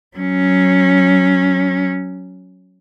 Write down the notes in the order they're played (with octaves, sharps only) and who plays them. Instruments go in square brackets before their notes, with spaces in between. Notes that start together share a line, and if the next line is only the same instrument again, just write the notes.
[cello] F#3 C#4